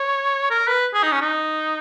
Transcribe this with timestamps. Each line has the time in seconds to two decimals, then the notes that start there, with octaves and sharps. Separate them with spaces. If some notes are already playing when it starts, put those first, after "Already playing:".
Already playing: C#5
0.50 A#4
0.67 B4
0.94 G#4
1.03 D#4
1.12 C#4
1.21 D#4